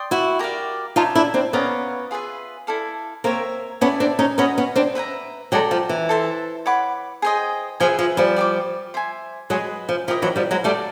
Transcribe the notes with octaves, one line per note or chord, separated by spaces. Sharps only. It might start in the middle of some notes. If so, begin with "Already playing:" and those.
Already playing: D5 G5 C6 D#6
E4 F#4
G4 A#4 D5 F5
D#4 F4 C#5 E5 A5
D4 E4
C4 D4
B3 C#4 D5 F5 A#5 D#6
F4 G#4 B4 E5
E4 A4 D5 F5
A#3 C4 A#4 C#5 E5
B3 C#4 E4 A4 D5
C4 D4
C#4 D#4
B3 C#4 F#4 B4 D#5
B3 C#4
C4 D4
B4 E5 G5 A#5
F#3 G#3 A4 D5 G5 A#5
F3
E3
A4 C5 E5 A5
C#5 F#5 B5 D6
G#4 C5 D#5 G5
F3 G#4 B4 E5 G#5
F3
F3 G3
D5 G5 B5 D6
C5 E5 G#5
F#3 G#3 G#4 B4 D#5
F3
F3 E4 G4 A#4 D#5
E3 F#3
F3 G3
F#3 G#3
G3 A3 A4 D5 F5 A5